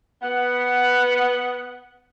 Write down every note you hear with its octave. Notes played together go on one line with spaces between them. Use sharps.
B3 F#5